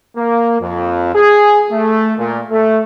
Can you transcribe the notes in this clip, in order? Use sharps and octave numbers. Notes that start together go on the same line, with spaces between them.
A#3
F2
G#4
A3
A#2
A3